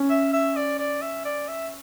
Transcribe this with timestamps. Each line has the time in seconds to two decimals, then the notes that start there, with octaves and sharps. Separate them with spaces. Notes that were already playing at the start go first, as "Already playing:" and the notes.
Already playing: C#4
0.10 E5
0.33 E5
0.56 D5
0.79 D5
1.02 E5
1.25 D5
1.48 E5